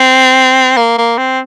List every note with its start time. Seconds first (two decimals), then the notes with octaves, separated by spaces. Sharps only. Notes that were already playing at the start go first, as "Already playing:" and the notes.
Already playing: C4
0.77 A#3
0.98 A#3
1.18 C4